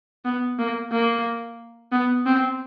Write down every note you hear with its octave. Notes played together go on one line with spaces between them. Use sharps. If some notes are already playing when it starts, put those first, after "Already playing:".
B3
A#3
A#3
B3
C4